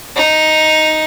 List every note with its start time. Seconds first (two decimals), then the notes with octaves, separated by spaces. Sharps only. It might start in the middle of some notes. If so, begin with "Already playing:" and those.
0.16 D#4